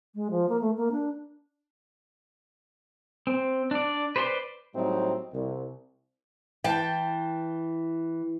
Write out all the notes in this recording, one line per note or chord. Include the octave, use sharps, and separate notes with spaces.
G#3
F3
A#3
A3
A#3
D4
C4
D4 D5
B4 C5 D5 G#5 C6
A2 F#3 G3 C4 D#4
C2
E3 G5 A5